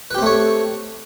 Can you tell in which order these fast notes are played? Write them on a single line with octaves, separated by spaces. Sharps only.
B4 G4 C4 A3 C#5